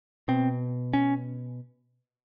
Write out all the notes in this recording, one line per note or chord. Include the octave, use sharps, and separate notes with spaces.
B2 C4
C#4